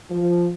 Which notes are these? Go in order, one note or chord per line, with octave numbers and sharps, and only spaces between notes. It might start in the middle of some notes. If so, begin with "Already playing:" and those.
F3